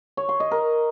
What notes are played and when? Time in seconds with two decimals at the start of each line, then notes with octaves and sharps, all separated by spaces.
0.17 C#5
0.29 C6
0.40 D#5
0.51 A#4